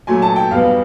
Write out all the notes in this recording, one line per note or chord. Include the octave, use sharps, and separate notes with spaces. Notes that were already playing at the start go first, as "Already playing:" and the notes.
A#2 F#3 A3 G#5
A5
G5
E2 B2 G3 B3 F5